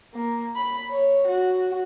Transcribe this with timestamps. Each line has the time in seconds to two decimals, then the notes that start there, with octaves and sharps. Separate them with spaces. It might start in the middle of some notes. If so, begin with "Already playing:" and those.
0.14 A#3
0.56 B5
0.90 C#5
1.28 F#4